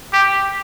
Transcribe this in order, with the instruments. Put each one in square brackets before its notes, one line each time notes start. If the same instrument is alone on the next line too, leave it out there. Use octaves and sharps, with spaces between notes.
[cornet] G4